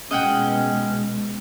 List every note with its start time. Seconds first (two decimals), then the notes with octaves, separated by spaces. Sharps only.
0.11 B2 G#3 C#4 D#5 F#5 G5